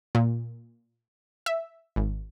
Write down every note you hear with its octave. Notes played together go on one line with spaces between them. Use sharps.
A#2
E5
G#1